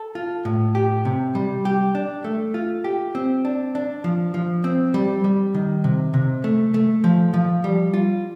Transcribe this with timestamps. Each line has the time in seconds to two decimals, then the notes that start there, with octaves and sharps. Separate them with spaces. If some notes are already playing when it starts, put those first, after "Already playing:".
Already playing: A4
0.15 F4
0.45 A2
0.75 G4
1.05 C3
1.35 G3
1.65 G4
1.95 D4
2.24 A3
2.54 F4
2.84 G4
3.15 C4
3.45 D4
3.75 D4
4.04 F3
4.34 F3
4.64 C4
4.94 G3
5.24 G3
5.54 D#3
5.84 C3
6.14 C3
6.44 A3
6.74 A3
7.04 F3
7.34 F3
7.64 G3
7.94 F4